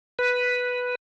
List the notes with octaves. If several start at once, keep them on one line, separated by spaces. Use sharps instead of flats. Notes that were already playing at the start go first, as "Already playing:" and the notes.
B4